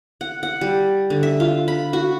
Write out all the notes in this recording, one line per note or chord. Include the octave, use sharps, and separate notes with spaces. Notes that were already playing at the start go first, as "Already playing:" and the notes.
F#5
F#5
G3
D3
E5
F4
B5
F#4